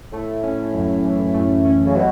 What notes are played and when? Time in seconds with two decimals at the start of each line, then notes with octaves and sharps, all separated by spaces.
0.12 A2 A3
0.43 C#4
0.73 F#2
1.05 E3
1.34 A3
1.65 C#4
1.86 C#3
1.95 B2 F#3